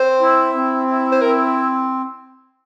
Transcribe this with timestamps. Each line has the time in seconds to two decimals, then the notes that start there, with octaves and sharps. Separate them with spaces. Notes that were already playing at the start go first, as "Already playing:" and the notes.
Already playing: C4 C5
0.20 E4
0.55 C4
0.88 E4
1.12 C5
1.21 C4 A#4